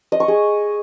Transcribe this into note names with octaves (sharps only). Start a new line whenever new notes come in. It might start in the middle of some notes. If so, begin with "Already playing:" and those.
D#5
C#6
G#4